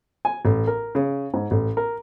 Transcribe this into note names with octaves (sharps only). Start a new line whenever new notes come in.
G#5
A1
A#4
C#3
G#2
A1
A#4